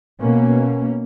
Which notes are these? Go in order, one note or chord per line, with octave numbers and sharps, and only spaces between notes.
B2 A#3 C#4